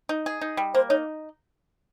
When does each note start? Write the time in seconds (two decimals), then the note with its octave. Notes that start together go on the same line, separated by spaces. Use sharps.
0.09 D#4
0.26 G#4
0.41 D#4
0.57 G3
0.74 A#3 C5
0.90 D#4 C#5